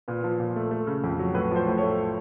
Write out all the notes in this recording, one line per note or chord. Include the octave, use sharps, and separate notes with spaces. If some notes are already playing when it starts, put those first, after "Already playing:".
A#2 B4
F3
A#2
A3
A3
C#3
F2
F#3
A2 B4
F3 C5
A2
C#5
A3